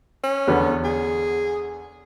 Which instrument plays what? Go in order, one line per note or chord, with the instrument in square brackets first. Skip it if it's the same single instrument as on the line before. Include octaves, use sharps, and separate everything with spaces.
[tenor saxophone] C#4
[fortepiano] E2 D3 B3
[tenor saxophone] G#4